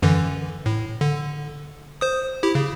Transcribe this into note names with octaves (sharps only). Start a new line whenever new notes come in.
F#2 D3 E3
A2
D3
C5 D#6
E4 G4
C#3